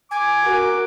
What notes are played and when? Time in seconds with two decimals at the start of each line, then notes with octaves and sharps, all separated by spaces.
0.11 G#5 D6
0.42 F#4 A#4